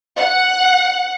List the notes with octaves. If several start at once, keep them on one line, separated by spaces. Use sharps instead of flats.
F#5